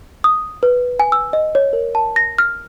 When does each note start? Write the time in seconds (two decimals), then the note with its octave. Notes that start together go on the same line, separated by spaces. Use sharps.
0.24 D#6
0.63 B4
1.00 G#5
1.12 E6
1.33 D#5
1.55 C#5
1.73 A#4
1.95 A5
2.16 A#6
2.38 F6